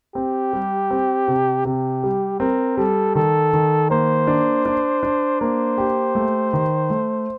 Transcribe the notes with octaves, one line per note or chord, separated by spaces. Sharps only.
C4 G4
G3
C4
C3
C3 G4
G3
C4 A#4
G3 A4
D#3 A4
D#3
A#3 C5
D4
D4
D4
A#3 C5
G4
A3
D#3
A3